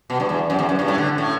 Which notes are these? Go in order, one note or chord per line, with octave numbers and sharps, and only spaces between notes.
B2
G2
E2
F#2
E2
F#2
G2
A2
D3
A2